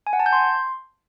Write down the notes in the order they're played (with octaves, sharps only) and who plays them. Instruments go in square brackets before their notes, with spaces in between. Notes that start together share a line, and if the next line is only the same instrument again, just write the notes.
[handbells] G#5
F#5
A5
G6
C6